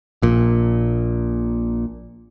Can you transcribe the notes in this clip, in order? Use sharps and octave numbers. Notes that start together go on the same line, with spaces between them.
A#1 A#2